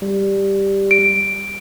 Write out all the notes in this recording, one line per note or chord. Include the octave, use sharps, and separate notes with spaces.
G3
D7